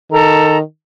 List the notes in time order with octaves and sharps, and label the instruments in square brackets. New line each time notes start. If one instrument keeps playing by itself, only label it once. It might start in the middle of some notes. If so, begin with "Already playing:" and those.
[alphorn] D#3 [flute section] A4 A#5